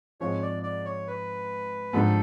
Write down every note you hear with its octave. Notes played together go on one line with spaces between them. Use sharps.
G#2 F3 G#3 C4 F4 C#5
D5
D5
C#5
B4
G#2 F3 A3 D4 G4 A4